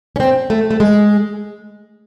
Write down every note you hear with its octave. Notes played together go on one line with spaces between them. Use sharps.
C#4
C4
A3
A3
G#3